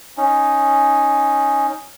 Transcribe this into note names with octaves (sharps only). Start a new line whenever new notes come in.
C#4 D#4